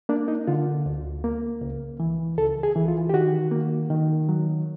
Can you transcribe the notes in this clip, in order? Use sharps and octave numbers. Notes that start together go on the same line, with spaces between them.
A#3 D4
D#4
D3 F4
D2
A#3
C#2
E3
C#2 A4
G#4
E3
F4
G4
D#3 F#4
A#3
D#3
F#3